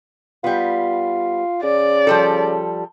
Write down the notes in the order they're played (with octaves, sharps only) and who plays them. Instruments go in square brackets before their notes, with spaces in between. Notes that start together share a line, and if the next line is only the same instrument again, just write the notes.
[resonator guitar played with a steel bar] G3 B3 [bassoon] F4
[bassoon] C#3 [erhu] D5
[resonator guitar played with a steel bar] F3 G3 A4